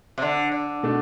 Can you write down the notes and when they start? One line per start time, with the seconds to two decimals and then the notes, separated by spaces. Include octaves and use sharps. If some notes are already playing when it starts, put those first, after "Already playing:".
0.18 C3
0.22 D3
0.52 D3
0.83 B2 A3 D4